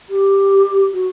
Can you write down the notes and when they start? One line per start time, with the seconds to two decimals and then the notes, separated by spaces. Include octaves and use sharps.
0.10 G4
0.93 F#4